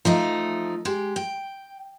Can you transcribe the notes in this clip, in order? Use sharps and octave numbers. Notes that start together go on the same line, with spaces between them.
F3 A3 D#4
G#3 G4
G5